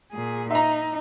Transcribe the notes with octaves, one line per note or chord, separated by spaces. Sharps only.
A#2 G#4
D#4 E5 A#5